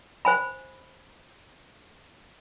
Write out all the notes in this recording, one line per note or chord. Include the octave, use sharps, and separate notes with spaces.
C5 G#5 B5